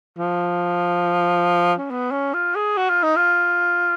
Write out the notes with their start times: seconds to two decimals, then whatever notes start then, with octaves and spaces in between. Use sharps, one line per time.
0.18 F3
1.78 C#4
1.91 B3
2.11 C#4
2.34 F4
2.55 G#4
2.77 F#4
2.89 F4
3.03 D#4
3.16 F4